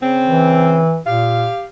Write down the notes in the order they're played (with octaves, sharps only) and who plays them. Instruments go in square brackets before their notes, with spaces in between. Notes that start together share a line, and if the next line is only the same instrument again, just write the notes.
[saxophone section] C#3 C4
[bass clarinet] E3
[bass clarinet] A#2 [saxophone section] G4 F5